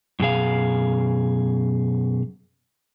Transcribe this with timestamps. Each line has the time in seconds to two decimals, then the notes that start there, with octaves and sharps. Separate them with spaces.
0.20 F#2 B2 G#4 F5